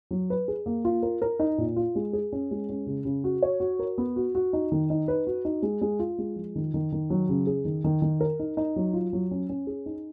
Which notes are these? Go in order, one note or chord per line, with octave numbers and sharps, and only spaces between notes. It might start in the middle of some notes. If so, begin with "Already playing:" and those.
F#3
B4
G#4
A#3
F4
A#4
A#4
D#4
A#2
F4
G#3
G#4
C#4
G#3
C#4
C#3
C#3
F#4
C#5
F#4
A#4
B3
F#4
F#4
D#4
D#3
D#4
B4
F#4
D#4
G#3
G#3
F4
G#3
F3
D#3
D#3
D#3
F#3
C#3
G#4
D#3
D#3
D#3
A#4
D#4
D#4
F#3
F4
F#3
C#4
C#4
G#4
D#4